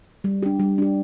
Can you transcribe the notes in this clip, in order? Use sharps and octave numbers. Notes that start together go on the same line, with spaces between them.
G3
D4 G4
G3
D4 G4